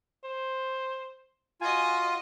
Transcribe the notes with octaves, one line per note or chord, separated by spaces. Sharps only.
C5
F4 F#4 D#5 G#5